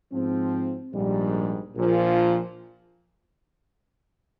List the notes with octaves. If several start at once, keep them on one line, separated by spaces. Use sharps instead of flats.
G#2 F3 C4
A#1 G#2 G3
A#1 A#2 F3